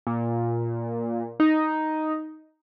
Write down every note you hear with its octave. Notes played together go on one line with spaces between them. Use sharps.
A#2
D#4